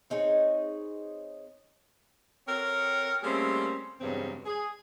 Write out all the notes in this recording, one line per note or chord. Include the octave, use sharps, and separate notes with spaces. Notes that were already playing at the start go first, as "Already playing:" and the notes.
C4 D#4 G#4 C#5
C4 F#4 A4 A#4 C#5
G3 A3 A#3 C4 C#4 G#4
E2 G2 C#3 F#3 G#3 C4
G#4